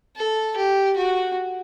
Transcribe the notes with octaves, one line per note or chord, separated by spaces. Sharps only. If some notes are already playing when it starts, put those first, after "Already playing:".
A4
G4
F#4